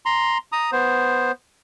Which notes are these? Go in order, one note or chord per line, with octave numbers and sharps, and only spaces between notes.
A#5 C6
A#5 D#6
B3 C5